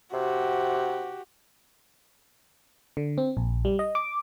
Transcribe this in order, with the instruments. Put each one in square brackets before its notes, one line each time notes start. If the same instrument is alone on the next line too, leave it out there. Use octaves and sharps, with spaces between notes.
[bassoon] C3 [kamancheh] F#4 G4
[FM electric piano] D3
C4
A#1
G3
D#5
D6